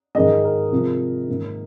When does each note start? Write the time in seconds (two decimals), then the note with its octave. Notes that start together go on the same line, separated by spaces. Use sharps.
0.15 G#2 D#3 G#3 D#5
0.44 A#4
0.72 C3 F3 G#3
1.28 G#2 D#3 A#3